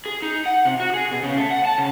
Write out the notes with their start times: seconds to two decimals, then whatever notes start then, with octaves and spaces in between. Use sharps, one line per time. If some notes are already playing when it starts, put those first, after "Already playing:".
0.06 G#4
0.22 D#4
0.46 F#5
0.65 C3
0.80 F#4
0.94 G#4
1.11 B2
1.23 C#3
1.37 A3
1.51 F#5
1.65 A5
1.78 C#3